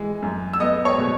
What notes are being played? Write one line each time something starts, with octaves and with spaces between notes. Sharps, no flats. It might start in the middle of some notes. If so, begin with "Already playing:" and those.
Already playing: E3 G#3
F#2
E6
B3 D#5 D#6
C#5 C#6
B2